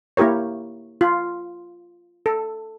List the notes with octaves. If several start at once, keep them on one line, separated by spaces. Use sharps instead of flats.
A#3 E4 G4 A#4 C#5
F4
A4